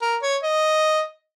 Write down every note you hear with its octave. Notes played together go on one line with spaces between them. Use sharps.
A#4
C#5
D#5